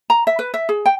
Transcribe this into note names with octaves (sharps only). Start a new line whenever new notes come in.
A#5
E5
B4
E5
G#4
G5